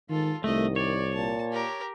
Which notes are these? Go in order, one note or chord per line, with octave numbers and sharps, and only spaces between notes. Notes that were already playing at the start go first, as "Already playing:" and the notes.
G#2 D#3 F4 A4
C2 D#3 A3 D#5
C#5 D5
A#2 A5
G4 A#4